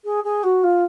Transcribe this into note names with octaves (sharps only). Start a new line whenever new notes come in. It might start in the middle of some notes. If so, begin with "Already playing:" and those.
G#4
G#4
F#4
F4